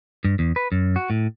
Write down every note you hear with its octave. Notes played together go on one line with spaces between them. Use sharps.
G2
E2
B4
F#2
F#4
A2